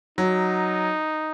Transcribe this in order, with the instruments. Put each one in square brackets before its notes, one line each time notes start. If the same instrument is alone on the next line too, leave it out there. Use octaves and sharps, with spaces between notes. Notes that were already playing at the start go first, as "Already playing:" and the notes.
[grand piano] F#3 [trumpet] D#4